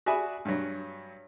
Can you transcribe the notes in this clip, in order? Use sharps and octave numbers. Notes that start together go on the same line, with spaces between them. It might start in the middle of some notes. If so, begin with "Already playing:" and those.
F#4 G#4 D5 E5 G#5 B5
G2 F#3